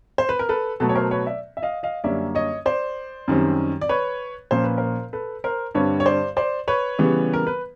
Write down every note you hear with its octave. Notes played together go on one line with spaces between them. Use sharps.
C5
B4
A#4
A4 B4
B2 F#3 A3 A4 B4
C#5
A#4 C5
B4 C#5
D5 E5
E5
D#5 F5
D#5 F5
F#2 D3 G3 A#3 C#4 D5 E5
C#5 D#5
C5 D5
F#2 D#3 G3 C4
D5
B4 C#5
A#2 F3 A#3 C#4 C5
B4
A#4 C5
A4 B4
A#4 C5
G2 D3 G3 C4 B4 C#5
C#5
C5 D5
C5 D5
B4 C#5
C#3 E3 G3 B3
A#4
B4